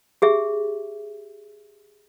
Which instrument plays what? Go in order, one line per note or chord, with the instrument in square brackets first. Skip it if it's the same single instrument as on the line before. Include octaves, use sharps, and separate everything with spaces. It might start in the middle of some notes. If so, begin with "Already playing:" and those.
[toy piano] G4 G#4 E5